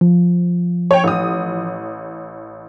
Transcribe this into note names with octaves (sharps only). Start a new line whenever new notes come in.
F3
C#5 G5
A1 D#6